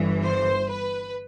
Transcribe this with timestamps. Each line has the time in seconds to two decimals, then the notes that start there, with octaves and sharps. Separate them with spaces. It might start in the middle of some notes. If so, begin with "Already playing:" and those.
Already playing: G1 G2 E3
0.24 C5
0.70 B4